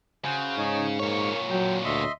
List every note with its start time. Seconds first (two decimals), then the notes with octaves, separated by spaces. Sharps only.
0.25 C#3 F#4 C5
0.57 G#2 D#4 C#5
1.00 A#2 A#3 C#5 C#6
1.50 F#3 G5
1.85 D2 D#5 E5 C6